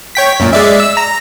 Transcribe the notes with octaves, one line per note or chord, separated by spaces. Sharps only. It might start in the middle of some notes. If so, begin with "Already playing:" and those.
C#5 G5 B6
F#2 A#2
G#3 D5 E5
E6
A#5